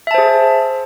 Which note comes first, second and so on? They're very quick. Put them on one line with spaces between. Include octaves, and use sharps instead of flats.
E5 A5 C5 G#4